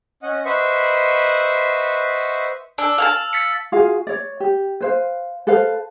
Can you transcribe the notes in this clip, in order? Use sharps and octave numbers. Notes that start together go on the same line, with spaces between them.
C#4 D#5 F#5
B4 C5 D#5 E5 F#5 C#6
D4 E6
F5 G#5 A5
A6 B6 C#7
F4 F#4 G#4 F5
C#5 D5
G4
B4 C5 F5
A4 B4 C5 F5